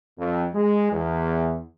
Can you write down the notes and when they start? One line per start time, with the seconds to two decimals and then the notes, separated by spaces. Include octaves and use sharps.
0.19 F2
0.54 G#3
0.91 E2